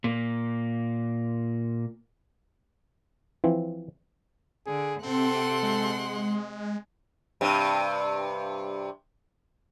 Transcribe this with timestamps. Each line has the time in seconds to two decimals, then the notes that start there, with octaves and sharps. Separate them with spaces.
0.04 A#2 A#3
3.44 E3 F3 C4
4.67 D3 G#4
5.03 C3 C4 A4 F#5 C6
5.63 G#3
7.41 G2 C3